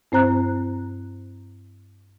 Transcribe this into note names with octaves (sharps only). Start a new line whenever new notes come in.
G2 C4 C5 A#5 F#6